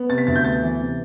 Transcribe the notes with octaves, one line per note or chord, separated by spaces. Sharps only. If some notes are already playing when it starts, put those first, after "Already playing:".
Already playing: B3
C3 A6
B6
D2 A6
G6
B3 A6
E3
C3